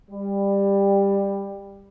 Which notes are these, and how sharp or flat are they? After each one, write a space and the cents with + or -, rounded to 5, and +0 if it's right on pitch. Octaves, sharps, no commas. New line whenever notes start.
G3 +15